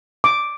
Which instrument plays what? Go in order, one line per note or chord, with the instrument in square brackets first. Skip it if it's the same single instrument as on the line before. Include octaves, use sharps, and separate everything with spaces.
[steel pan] D6